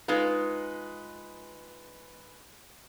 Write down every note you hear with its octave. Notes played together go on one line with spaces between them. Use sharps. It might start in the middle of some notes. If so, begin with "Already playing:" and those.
G#3 D#4 F4 B4